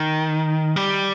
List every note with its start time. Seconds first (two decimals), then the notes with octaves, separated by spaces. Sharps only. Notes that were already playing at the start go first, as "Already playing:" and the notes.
Already playing: D#3
0.76 G3